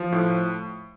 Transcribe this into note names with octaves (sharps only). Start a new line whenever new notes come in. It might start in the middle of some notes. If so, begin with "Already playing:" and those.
Already playing: F3
A2